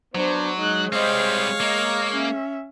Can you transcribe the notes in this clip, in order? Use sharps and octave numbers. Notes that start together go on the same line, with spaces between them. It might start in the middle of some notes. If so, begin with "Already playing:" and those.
F#3 B3 D4 C5
G#3 D#4 F#6
G3 C4 C5 C#5 D#5 F5
A#3 D#5 A#5
C#4 E5